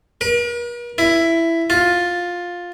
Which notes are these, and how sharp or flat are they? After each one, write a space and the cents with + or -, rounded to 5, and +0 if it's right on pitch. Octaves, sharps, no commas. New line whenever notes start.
A#4 +45
E4 +10
F4 +10